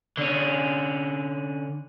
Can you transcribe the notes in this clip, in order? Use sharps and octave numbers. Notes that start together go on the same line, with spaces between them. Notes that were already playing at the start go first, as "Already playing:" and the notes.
D3 C#4